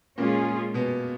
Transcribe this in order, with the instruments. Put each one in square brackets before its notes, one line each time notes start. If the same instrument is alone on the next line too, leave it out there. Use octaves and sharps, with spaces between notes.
[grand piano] A#2 A#3 [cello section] G#3 C#4 F4 G#4
[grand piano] B2 B3